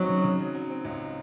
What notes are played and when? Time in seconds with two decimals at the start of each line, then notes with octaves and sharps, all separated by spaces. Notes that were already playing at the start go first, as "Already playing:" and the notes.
Already playing: F#3 C4 D#4
0.09 C#3
0.24 C#3
0.39 F#3
0.55 F#3
0.70 C4
0.85 C#2